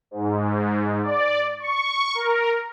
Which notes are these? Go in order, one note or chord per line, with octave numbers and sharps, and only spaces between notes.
G#2
D5
C#6
A#4